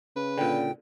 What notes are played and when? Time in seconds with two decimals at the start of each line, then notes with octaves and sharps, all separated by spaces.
0.16 C#3 B4
0.38 A#2 D3 G5